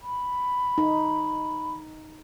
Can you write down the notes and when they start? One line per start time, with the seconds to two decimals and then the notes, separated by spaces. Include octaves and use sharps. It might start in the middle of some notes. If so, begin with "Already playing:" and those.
0.02 B5
0.78 D#4